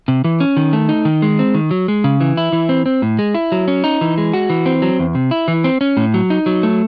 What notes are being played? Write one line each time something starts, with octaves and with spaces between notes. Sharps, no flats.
C3
E3
C#4
D#3
A3
D#4
D#3
G#3
C4
D#3
F#3
G#3
C#3
E3
E4
E3
C4
C4
A2
G#3
E4
F#3
C#4
D#4
E3
G#3
F#4
E3
C4
F#3
E2
C3
E4
E3
C4
C#4
A2
F#3
D#4
F#3
A3